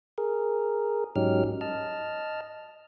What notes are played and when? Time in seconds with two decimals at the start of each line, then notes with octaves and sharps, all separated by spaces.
0.18 G#4 A#4
1.16 G#2 F#3 C#4 D#4 G4 F6
1.61 D#5 A5 F6